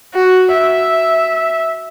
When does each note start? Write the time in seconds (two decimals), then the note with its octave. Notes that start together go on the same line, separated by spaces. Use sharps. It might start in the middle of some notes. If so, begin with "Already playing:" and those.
0.15 F#4
0.53 E5